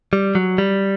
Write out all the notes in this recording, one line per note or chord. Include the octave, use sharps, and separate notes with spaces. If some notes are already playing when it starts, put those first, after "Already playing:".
G3
F#3
G3